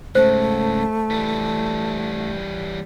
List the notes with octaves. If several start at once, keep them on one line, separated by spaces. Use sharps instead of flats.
G#2 C#3 A3 C5
E3 G3